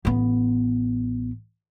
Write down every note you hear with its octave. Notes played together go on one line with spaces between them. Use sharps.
A1 B3